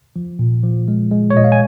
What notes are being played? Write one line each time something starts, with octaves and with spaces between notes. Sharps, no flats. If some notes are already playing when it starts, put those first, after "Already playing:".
F3
A#2
F3
G#3
G#3
C#5
A#2 D#5
F5
G#5